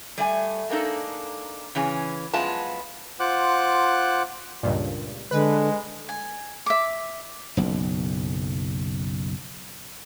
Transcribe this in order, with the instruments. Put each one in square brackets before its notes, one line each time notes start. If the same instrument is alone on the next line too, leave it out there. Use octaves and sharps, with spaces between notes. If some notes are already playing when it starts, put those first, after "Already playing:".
[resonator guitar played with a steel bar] G3 A3 G#5
G#3 A#3 D4 D#4 A4
C#3 E3 C#4 G#4
F#2 F3 G#3 B3 F4 A5
[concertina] F4 C5 F#5 D6 F#6
[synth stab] C#2 G2 A#2
[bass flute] D3 [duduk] G#3 [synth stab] B4
[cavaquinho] G#5
E5 D6
[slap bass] F#1 B1